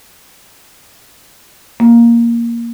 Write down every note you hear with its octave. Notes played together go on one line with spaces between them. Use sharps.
A#3